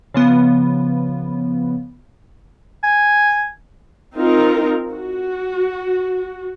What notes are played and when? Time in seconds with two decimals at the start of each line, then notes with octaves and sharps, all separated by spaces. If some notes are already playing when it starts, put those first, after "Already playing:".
0.14 C#3 F3 B3
2.84 G#5
4.15 C4 D#4 F4 A#4
4.91 F#4